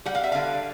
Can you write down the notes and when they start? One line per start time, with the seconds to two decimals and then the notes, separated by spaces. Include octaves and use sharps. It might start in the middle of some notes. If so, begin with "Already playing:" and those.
0.06 G3 F#5
0.15 F5
0.23 E5
0.32 D3 F5